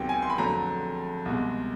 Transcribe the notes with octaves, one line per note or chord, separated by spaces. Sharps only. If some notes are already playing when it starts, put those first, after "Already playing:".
Already playing: C#2 C3 D#3 F#3 B3 G5
G#5
C6
B5
F2 D3 F#3 A3 A#5
C2 B2 G#3